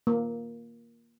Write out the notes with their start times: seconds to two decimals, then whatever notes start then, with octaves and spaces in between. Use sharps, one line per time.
0.07 A#3